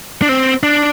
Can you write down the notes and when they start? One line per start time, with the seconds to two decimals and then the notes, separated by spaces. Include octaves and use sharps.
0.22 D4
0.29 C4
0.63 D4